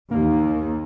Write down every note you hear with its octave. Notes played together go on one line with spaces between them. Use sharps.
D#2 D#3 A#3